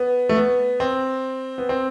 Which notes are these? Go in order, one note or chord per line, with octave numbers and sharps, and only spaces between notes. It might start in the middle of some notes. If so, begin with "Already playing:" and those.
Already playing: B3
A3
B3
C4
B3
C4